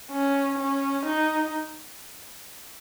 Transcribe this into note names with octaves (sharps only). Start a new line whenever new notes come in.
C#4
C#4
D#4